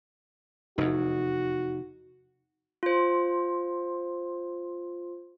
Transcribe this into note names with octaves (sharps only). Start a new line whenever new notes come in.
F1 E2 D#4 F#4
F4 C5